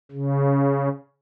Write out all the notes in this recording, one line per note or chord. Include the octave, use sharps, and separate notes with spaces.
C#3